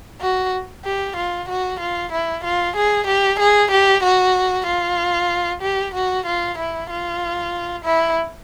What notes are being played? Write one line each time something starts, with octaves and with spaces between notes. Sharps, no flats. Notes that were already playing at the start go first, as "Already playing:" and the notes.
F#4
G4
F4
F#4
F4
E4
F4
G#4
G4
G#4
G4
F#4
F4
G4
F#4
F4
E4
F4
E4